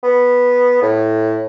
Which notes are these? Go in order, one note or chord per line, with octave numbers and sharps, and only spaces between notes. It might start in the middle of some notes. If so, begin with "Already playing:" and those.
B3
A2